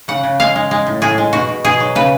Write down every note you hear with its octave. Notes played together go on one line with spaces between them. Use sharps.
C#3 F#5
C#3
G#3 F5
G#3
G#3
A2
A2 G#4
G#3
B2 F#4
B2
B2 G#4
F#3
C#3 B4